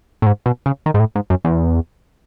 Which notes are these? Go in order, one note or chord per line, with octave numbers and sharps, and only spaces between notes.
A2
G#2
B2
C#3
D#3
G#2
A2
G#2
F#2
E2